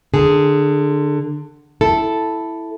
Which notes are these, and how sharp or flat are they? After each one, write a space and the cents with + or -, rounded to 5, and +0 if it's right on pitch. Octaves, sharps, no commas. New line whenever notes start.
D3 +20 G#4 +0
E4 +0 A4 +0